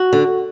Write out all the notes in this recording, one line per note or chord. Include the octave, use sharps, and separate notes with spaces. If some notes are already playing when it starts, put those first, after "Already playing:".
Already playing: F#4
D3